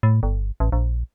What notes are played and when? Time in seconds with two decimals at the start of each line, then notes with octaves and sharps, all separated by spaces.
0.03 A2
0.23 G1
0.60 A1
0.72 A#1